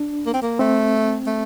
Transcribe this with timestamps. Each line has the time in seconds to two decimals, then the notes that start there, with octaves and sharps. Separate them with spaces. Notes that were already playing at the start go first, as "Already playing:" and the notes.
Already playing: D4
0.26 A#3
0.34 C4
0.42 A#3
0.59 A3 C4
1.27 A3